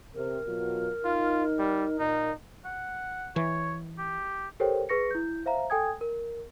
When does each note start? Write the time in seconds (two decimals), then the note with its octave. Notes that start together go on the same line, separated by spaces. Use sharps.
0.15 C3 C4 A#4
0.46 B2 F#3 F4
1.04 D#4 F4
1.58 G3
1.99 A#2 D#4
2.65 F#5
3.36 E3 C#5
3.98 G4
4.60 G4 A4 A#4 C5 C#5 G5
4.89 G#4 B4 C#6 A#6 C#7
5.11 E4 G6
5.46 C5 E5 F5 A#5
5.70 A4 G5 G#5 D#6 G#6
6.01 A#4